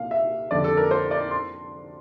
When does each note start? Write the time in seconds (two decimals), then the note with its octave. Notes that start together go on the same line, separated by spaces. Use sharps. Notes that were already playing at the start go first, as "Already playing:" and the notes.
Already playing: C2 A#2 F5
0.11 E5
0.51 F1 F2 D3 D5
0.64 A4
0.77 A#4
0.91 C5
1.11 D5
1.31 C6